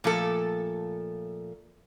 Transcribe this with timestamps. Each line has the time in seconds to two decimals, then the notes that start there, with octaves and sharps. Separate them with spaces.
0.04 A#2 F3 A3 A4